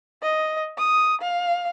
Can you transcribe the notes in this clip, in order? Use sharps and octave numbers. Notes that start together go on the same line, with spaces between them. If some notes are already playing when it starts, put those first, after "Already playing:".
D#5
D#6
F5